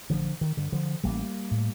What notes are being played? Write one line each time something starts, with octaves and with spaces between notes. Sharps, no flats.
A1 D3 F3
D#3
G2 D3
D3 F3
A1 G3 A#3
A2